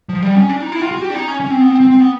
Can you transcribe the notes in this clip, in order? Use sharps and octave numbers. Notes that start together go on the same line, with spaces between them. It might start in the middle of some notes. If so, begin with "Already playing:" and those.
F3
G3
C#4
D4
D#4
E4
F4
F#4
G4
D4
D#4
C#4
C#4
C4
B3
C4
C4
C4
B3